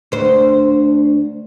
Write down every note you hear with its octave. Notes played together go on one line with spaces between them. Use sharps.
D2 C5